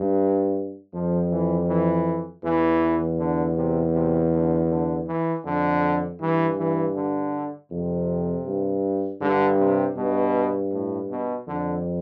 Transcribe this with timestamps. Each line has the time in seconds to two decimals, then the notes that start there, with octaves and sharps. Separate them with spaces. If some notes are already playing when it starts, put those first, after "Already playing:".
Already playing: G2
0.93 F2 F3
1.30 E3
1.68 E3
2.43 E2 E3
3.19 D3
3.56 C3
3.94 C3
4.32 D3
4.70 D3
5.07 E3
5.45 F2 D3
6.20 G2 E3
6.58 E3
6.95 D3
7.71 F2 C3
8.45 G2
9.21 G2 D3
9.59 C3
9.97 G2 B2
10.72 A2
11.10 B2
11.47 F2 D3